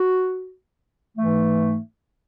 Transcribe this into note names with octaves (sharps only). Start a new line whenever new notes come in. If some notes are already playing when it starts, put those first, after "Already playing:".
Already playing: F#4
G#2 E3 A3